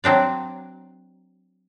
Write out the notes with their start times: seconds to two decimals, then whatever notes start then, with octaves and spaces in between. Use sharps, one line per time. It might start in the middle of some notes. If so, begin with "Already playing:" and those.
0.04 F#3 C4 D4 D5